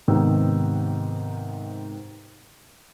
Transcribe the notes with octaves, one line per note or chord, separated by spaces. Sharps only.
G#2 C3 D#3 B3 E6